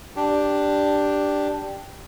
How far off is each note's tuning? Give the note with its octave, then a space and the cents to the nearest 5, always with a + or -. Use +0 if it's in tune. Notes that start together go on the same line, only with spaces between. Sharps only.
D4 +0 G4 +0